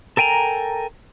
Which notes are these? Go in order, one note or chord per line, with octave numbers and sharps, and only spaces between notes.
A4 A#4 G5 G#5 A#5